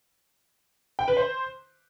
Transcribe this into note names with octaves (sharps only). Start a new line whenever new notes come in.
G5
B4
C5